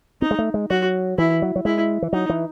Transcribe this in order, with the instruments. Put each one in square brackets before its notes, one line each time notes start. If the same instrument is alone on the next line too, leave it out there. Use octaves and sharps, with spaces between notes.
[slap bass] C4 [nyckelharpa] D#4
[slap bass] G#3
A3
G#3
[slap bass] F#3 [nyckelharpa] F#4
[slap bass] E3 [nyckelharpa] E4
[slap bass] F#3
F#3
[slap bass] G#3 [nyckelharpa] E4
[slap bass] E3
[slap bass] F#3 [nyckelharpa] D#4
[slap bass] E3